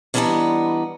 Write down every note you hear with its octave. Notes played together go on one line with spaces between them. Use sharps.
D3 E3 G3 B3 D4 D#4